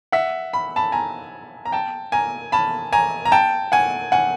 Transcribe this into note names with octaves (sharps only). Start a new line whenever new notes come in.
E5 F#5
B5
A5 B5
G#5 A#5
A#5
G5 A5
G#5 A#5
A5 B5
G#5 A#5
A#5
G5 A5
F#5 G#5
F#5 G#5